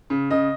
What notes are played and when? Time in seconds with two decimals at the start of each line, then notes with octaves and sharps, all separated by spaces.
0.10 C#3
0.31 C#3 D#5